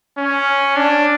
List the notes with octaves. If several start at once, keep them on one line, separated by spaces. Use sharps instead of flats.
C#4
D4